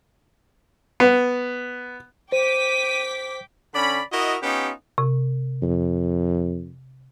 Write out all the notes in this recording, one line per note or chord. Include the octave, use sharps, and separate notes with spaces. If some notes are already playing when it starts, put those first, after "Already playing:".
B3
C5 G5 D6 B6 D#7
D3 C#4 D5 B5
E4 F#4 A#4 D#5
B3 C#4 D#4 F4 G4
C3
F2